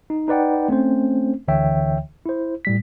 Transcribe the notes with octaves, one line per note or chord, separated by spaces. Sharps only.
D#4
D#4 B4 D5 F#5 G5
A3 C4 C#4 C5
D2 D3 E3 C#5 E5 G5
E4 C5
A2 G3 B6